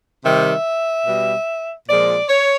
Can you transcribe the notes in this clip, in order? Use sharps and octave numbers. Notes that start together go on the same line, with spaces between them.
C3 D#3 G3 E5
B2 G3
A#2 F3 G#3 D5
C#5